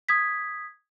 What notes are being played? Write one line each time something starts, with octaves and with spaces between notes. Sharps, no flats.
D#6 G#6 B6